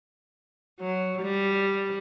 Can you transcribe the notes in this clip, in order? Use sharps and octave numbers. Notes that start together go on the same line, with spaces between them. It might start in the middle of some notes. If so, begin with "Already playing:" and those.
F#3
G3